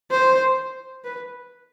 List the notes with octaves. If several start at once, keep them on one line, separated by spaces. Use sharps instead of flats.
C5
B4